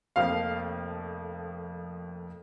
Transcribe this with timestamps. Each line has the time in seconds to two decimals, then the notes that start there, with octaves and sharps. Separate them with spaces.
0.16 F1 F2 F3 A#3 F5